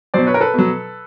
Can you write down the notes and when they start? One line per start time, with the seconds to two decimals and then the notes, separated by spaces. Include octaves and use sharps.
0.14 B2 F#3 C5 D5
0.27 B4 C#5
0.34 A#4
0.40 A4 B4
0.54 B2 F#3